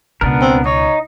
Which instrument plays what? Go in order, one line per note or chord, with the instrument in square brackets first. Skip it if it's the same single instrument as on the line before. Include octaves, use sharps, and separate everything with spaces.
[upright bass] C#2 B2 [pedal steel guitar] B3 D4 A#4
[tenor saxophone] C4
[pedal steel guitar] D#4 [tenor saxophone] C#5